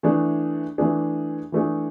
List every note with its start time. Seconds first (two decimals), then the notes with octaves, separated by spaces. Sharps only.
0.03 E3 A3 D4 G#4
0.78 E3 A3 D4 G#4
1.52 E3 A3 D4 G#4